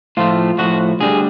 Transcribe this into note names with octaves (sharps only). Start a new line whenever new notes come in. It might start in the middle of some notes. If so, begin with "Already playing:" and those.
A2 F3 A3 F4
A2 F3 A3 F#4
D2 D3 G3 G#4